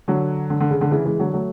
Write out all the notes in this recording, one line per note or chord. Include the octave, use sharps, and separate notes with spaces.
D3 F#3
D3
D3
C#3
D3
C#3 E3
E3 G#3
D3 F#3
F#3 A3